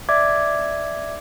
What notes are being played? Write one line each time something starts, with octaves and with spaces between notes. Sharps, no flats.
D5 E5 D6 G#6